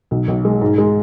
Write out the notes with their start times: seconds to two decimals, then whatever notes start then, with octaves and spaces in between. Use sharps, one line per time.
0.11 B1
0.28 B1
0.45 G#3
0.62 G#2
0.78 G#3